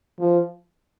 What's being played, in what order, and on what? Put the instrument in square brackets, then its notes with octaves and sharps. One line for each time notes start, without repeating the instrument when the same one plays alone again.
[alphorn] F3